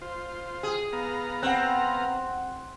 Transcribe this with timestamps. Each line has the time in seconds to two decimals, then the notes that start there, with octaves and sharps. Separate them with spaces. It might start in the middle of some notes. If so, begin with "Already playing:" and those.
0.02 F4 C5
0.63 G#4
0.93 B3 F5 A#5
1.43 C4 F#5 F#6